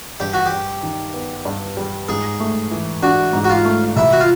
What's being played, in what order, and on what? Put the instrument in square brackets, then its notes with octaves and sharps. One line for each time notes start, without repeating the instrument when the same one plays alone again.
[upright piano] G2 [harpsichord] G4
[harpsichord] F#4
G4
[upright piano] G3
D#3
B3
G2
G3
[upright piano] G#2 [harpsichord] G#4
[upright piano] A3
E3
[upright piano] D4 [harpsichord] F#4
[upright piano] G#2
[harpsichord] F#4
F4
[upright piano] A3
[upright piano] C2 [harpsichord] E4
[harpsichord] F#4
F4